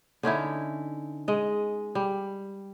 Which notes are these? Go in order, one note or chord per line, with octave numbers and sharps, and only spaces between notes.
D3 C#4 D#4 E4
G#3 D#5
G3